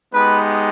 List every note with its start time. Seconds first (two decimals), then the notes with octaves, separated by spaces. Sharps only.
0.13 G#3 B3 D#4 G4 B4 B5